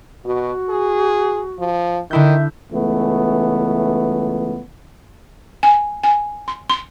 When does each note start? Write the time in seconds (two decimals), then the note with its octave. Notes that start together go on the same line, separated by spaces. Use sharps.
0.25 B2 F#4
0.69 G#4
1.59 F3
2.11 D3 D#3 E4 E5 G6
2.73 C#2 E3 A3 B3
5.63 G#5
6.04 G#5
6.48 C6
6.70 C6